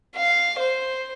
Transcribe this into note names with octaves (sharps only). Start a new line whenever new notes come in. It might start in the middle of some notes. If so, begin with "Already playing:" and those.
F5
C5